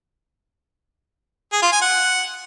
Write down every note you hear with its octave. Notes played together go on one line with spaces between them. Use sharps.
G#4
F4
G#5
F#5